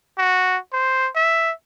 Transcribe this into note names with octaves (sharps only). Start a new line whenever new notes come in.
F#4
C5
E5